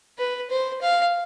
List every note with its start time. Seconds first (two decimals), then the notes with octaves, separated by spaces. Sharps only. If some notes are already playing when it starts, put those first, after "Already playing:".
0.18 B4
0.51 C5
0.82 F5